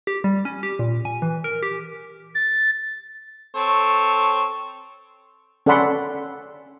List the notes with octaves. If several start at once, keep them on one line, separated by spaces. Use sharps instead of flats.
G4
G3
C#4
G4
A#2
G#5
E3
A#4
G4
A6
C4 A4 C#5
C#4 A4 D5 F#5 B5 C6